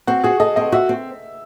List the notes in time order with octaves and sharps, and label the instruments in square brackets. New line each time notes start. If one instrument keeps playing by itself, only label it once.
[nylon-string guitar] C4 [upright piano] F#4
[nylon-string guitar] F#4 [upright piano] G#4
[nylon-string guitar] A4 [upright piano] D#5
[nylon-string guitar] C4 [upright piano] D#5
[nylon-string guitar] F#4 [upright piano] E5
[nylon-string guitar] C4